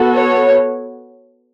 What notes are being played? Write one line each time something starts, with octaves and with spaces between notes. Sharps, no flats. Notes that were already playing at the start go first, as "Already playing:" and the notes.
Already playing: B3 F#4 A4
C#5